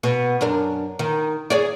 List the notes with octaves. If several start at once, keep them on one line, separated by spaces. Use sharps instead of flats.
B2
F#2 D4 A#4
D#3
G#4 C#5 D5